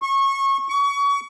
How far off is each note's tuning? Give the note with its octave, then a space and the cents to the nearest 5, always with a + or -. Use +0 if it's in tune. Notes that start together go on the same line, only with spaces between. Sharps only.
C#6 -25
C#6 +30